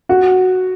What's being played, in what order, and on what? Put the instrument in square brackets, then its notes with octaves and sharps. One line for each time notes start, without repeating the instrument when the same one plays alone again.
[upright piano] F#4